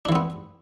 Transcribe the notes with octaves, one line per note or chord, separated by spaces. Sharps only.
E3 B3 C4 D4